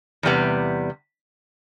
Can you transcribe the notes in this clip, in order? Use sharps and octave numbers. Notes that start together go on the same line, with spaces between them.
E2 C3 G3 B3